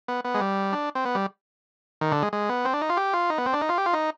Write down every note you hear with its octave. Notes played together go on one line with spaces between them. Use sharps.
B3
B3
G#3
G3
D4
C4
B3
G3
D#3
D3
G#3
G#3
B3
C4
D4
D#4
F4
G4
F4
D#4
B3
C4
D4
D#4
F4
G4
F4
D#4